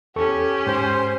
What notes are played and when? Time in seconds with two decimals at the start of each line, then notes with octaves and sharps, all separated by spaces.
0.16 E2 C#4 G4 A4 C#6
0.67 G#2 C5